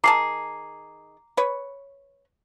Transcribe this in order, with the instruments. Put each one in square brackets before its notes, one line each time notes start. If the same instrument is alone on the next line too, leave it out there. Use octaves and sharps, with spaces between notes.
[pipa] D#3 G#4 A5 [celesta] A#5 D6 C7
[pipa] B4 C#5